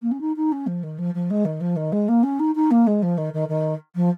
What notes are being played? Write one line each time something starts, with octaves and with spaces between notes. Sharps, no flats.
A#3
C#4
D#4
D#4
C#4
F3
D#3
F3
F3
G#3
D#3
F3
D#3
G#3
A#3
C#4
D#4
D#4
A#3
G#3
F3
D#3
D#3
D#3
F3